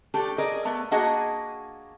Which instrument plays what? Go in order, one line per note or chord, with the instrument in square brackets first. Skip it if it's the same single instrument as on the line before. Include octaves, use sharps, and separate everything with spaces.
[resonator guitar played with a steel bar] A3 D4 G4 A4
G#4 A#4 D5 D#5
A3 B3
A#3 D4 F#4 G#4 D#5 F#5